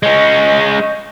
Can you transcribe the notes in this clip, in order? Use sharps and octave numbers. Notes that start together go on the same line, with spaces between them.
G#3 C#4 D#5 C#6 G6